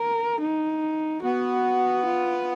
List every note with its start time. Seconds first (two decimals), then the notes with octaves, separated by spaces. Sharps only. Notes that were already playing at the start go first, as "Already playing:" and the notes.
Already playing: A#4
0.41 D#4
1.23 B3 F#4
2.06 F4